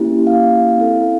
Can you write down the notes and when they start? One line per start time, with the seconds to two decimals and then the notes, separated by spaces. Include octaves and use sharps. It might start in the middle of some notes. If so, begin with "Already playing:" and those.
Already playing: A#3 C#4 E4 G4
0.27 F5
0.78 C4 E4 A4